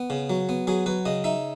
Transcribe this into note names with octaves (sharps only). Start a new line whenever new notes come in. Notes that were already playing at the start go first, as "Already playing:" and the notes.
Already playing: B3
C#3
F#3
B3
F#3 G#4
F#3 B4
C#3 D#5
D#4 E5